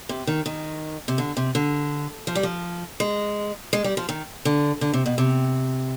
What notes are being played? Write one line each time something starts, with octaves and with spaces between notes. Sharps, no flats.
C3
D#3
D#3
C3
D3
C3
D3
F3
G3
F3
G#3
G#3
G3
F3
D#3
D3
D3
C3
B2
C3